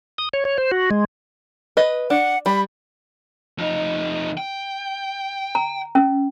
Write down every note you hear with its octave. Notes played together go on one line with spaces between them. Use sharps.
D#6
C#5
C#5
C5
F#4
G#3
B4 D#5
D4 F#5
G3 B5
F2 D#4
G5
A#5
C#4